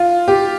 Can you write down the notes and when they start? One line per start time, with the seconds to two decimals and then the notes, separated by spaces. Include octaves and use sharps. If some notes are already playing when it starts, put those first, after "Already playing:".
Already playing: F4
0.28 G4